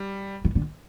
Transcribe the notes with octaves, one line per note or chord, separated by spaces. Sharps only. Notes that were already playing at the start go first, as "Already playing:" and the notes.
Already playing: G3
D#3
D3